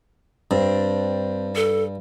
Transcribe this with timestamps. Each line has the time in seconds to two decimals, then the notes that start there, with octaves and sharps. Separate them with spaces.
0.51 G2 C4 D4
1.56 A4